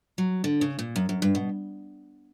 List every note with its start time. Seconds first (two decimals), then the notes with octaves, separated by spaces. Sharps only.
0.18 F#3
0.44 D3
0.61 C#3
0.79 A#2
0.96 F#2
1.09 F#2
1.22 G2
1.35 B2